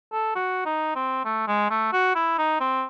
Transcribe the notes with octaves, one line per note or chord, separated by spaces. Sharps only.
A4
F#4
D#4
C4
A3
G#3
A3
F#4
E4
D#4
C4